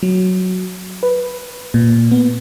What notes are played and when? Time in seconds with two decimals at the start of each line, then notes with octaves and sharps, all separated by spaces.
0.03 F#3
1.03 B4
1.74 A#2
2.12 B3